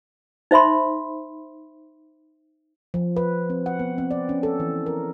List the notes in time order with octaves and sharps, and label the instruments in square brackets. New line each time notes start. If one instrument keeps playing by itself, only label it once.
[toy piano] D#4 C5 E5 B5 C6
[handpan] F3
B4
C4
F#5
B3
C4
D5
C#4
A4
E3
A#4